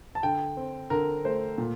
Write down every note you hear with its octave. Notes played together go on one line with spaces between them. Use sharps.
A5
D3 G5
C4
D3 A#4
A3 C5
A#2